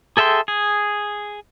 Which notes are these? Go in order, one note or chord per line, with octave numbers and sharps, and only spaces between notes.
G#4 A4 E5 G5 C6
G#4